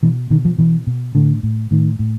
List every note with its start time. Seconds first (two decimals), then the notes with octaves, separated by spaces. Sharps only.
0.03 B2 E3
0.30 B2 D#3
0.45 F3
0.58 B2 E3
0.87 B2
1.15 A2 D3
1.43 A2
1.71 A2 D#3
1.99 A2